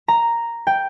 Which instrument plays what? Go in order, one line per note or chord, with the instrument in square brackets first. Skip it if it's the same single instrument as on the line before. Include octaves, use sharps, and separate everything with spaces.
[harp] A#5
G5